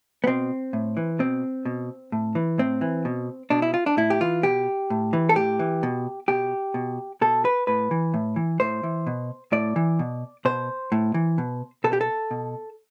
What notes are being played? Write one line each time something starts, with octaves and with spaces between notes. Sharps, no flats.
B3
B2 C4
A2
E3
B2 C4
B2
A2
E3
A2 C4
E3
B2
B2 D4
E4
F4
D4
A2 E4
G4
E3 F4
B2 G4
A2
E3
A4
A2 G4
E3
B2
B2 G4
B2
B2 A4
B4
A2 B4
E3
A2
E3
A2 C5
E3
B2
A2 D5
E3
B2
B2 C5
A2
E3
B2
B2 A4
G4
A4
B2